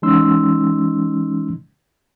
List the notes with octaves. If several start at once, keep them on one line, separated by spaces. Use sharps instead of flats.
E3 G#3 C#4 D#4 C6 E6